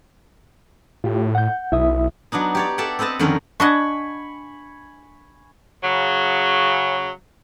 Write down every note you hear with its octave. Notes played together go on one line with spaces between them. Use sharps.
A2 F4 G4
F#5 G6
B1 E4 E5 D#6
F#3 B3 D4 D#4
G4 C#5 D5
A4 D5 E5 F#5 G5
C4 A4 B4 D#5 A5
F2 D3 D#3 C#4 A#4 D#5
D4 D#5 F#5 G#5 B5 C#6
C#3 F#3